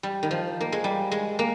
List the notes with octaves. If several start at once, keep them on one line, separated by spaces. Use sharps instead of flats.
G3
D#3
F3
A#3
G#3
G3
G#3
A#3